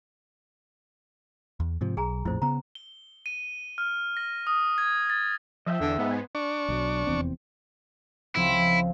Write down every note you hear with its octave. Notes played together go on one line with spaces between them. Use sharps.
E2
G#2 C3 F3
B1 G#4 G#5 A#5
A#1 F2 A2 F4 C5
C#3 B3 A#5
G7
D#7
F6
A#6
D#6
G#6
A6
F3 D#5 E5 G5
E2 D3
G#2 B3
D#4 C5 G#5
D4 C#6
B1 F#3
F1 E2 C4
C#2 F3 C4 E4